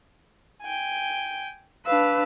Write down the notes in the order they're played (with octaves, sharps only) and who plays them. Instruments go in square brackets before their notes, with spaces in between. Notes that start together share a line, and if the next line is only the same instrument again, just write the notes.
[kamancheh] G5 G#5
[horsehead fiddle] D4 B4 [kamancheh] F5 E6